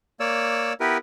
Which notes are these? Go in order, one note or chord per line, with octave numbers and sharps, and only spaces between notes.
A#3 C#5 D5 E6
B3 E4 G4 A#4 B4